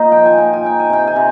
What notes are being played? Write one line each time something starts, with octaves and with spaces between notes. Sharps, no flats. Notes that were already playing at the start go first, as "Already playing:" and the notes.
Already playing: A#2 D#4 C5 D#5
F3 G5
G#5
A#2 G5
G#5
D#4 G5
G#5
C3 G5
G#5
C3